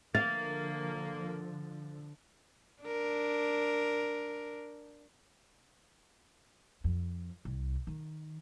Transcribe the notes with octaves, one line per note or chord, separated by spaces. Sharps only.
D3 F3 A#3 F5 A6
D4 A#4
F2
C2
D#3